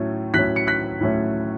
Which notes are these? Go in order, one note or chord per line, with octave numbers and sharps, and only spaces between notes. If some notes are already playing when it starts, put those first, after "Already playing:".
Already playing: A2 F#3 A3 C#4
A2 F#3 A3 C#4 F#6 B6
C#7
F#6 B6
A2 F#3 A3 C#4